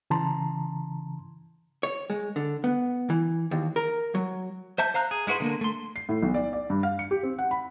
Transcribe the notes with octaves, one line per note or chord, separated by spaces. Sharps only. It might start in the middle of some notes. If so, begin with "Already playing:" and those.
C#3 E3 A5 A#5 C6
C#5
G#3
D3
B3
E3
D#2
A#4
F#3
C5 E5 A5 G6
C5 F5 A#5 F#6
G#4
G#3 E4 F#4 B4 C6
D3 A3 A#3
A3 C6
C7
A2
B1
D5
D5
G2
F5
C#7
G4
C4
F#5
B5